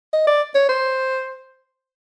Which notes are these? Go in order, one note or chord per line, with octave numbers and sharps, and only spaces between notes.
D#5
D5
C#5
C5